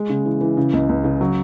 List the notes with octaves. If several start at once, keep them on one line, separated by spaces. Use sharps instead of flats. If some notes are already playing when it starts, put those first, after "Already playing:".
Already playing: G#3
C#3
E3
E3
C#3
C#2
C#2
C#3
F#3